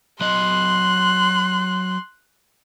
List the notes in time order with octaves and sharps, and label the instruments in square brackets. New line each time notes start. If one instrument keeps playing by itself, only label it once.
[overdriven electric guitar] F#3 D#5 [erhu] C6 [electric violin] F#6